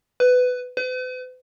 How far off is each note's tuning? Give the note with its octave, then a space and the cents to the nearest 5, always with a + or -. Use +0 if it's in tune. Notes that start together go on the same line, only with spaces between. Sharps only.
B4 +15
B4 +45